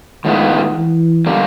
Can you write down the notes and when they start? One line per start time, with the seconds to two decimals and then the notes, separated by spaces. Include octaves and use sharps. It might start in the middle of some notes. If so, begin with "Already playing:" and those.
0.24 A2 D#3 F3 G#3 B3
0.75 E3
1.26 D3 G3 A#3